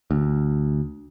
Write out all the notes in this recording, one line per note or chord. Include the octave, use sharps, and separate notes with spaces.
D2